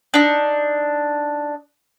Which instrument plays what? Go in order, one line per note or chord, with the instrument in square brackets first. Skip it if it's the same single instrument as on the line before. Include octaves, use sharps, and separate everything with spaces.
[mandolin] D4 D#4